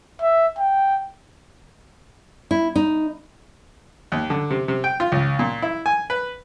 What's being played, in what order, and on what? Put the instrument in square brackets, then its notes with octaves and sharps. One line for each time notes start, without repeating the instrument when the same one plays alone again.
[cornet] E5
G5
[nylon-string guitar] E4
D#4
[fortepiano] D#2
D3
C3
C3
G5
F4
C#2
A#2
E4
G#5
B4